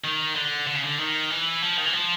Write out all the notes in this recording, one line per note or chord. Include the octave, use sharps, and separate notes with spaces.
D#3
D3
D3
C#3
D3
D#3
E3
F3
D#3
E3
F3